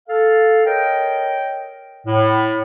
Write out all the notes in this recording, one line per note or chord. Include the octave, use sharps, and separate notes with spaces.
A4 F5
A#4 C#5 D#5 G5
A2